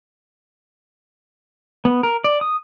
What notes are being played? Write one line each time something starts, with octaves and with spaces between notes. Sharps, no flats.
B3
A#4
D5
D#6